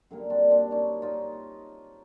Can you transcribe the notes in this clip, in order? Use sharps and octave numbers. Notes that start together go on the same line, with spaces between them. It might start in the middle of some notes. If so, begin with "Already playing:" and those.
F#2 D3 G3 A#3
C4 D4
C4 D4
C#4 D#4
D#4 F4